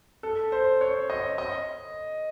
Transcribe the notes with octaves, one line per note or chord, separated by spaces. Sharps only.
A4
C5
C#5
D#5
D#5